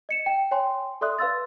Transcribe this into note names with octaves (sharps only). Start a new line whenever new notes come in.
D#5 C#7 E7
G5
C#5 G5 G#5 C6
A4 D5 E5 C6 D#6 F#6
B4 F5 C6 E6 A6